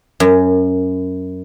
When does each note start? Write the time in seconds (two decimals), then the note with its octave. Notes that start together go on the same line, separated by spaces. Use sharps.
0.20 F#2